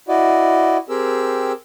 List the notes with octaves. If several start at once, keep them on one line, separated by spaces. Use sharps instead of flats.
E4 F#4 D5 D#5
C4 G4 G#4 A#4 E6